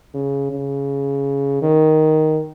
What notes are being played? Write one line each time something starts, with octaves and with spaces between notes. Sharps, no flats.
C#3
C#3
D#3